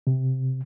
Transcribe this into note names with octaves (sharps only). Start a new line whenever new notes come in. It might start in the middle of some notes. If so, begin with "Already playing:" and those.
C3